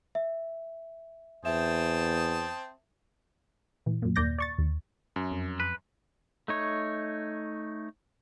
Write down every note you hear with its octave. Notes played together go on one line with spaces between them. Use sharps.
E5
E2 C4 E5 A5 D#6 E7
A#2 E3
F#2 A#2
D#2 A#3 D5 G6 A#6
D5 C#6 A6
D#2
F#2
F2
B4
A3 D#4 C#5